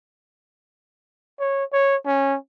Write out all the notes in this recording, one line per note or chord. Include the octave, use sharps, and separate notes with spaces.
C#5
C#5
C#4